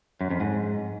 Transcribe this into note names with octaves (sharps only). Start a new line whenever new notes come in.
F#2
F2
G#2